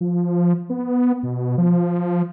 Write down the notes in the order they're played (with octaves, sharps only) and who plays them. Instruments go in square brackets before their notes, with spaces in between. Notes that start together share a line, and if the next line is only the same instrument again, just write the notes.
[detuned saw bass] F3
B3
B2
F3